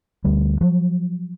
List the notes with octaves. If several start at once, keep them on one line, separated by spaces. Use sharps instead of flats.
D2 G3
F3 F#3